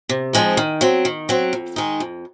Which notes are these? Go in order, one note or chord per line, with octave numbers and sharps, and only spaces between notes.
C3
F3 G#3 C4 D#4
D#3
F#3 C4
D#3
F#3 C4
F2
D#3 G#3 D#4
F2